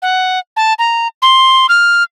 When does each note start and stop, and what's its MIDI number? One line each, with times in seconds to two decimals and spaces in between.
0.02 0.39 78
0.57 0.74 81
0.79 1.08 82
1.22 1.67 84
1.69 2.03 89